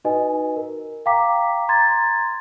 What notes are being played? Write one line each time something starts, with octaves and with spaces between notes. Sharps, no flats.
D#4 F#4 B4 D#5 G#5
A#4
F5 G5 A#5 D6 B6
A#5 C6 G#6 A6